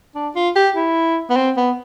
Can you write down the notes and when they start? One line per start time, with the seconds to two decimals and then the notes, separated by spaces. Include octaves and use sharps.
0.15 D4
0.35 F4
0.56 G4
0.76 E4
1.30 B3
1.37 C4
1.57 B3